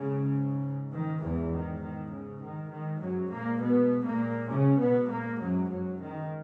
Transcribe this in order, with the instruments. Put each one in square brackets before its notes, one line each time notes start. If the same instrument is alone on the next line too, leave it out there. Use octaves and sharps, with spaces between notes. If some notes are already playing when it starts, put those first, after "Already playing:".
Already playing: [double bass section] G#2 C#3
D#3
E2 E3
D#3
D#3
C#3
D#3
G#2 D#3
F#2 F#3
A#2 A#3
B2 B3
A#2 A#3
C#3 C#4
B2 B3
A#2 A#3
F#2 F#3
F#2 F#3
D#3